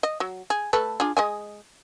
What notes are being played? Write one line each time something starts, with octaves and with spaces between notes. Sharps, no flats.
D#5
F#3
G#4
A3 A4 B4
D4 F4 G#4
G#3 D#5 G#5